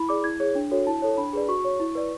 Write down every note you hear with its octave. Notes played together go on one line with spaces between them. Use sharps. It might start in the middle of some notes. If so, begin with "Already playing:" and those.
Already playing: E4 B5
G#4 D5 D6
E4 G#6
G#4 C#5
D4
F#4 A4 C#5
E4 A5
A4 C#5
D4 B5
G#4 B4 D5
F#4 C#6
C#5
E4
B4 D5